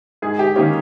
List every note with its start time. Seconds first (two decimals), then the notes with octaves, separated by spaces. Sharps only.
0.22 G#2 G#4
0.39 G4
0.56 D#3 A#3 C#4 G4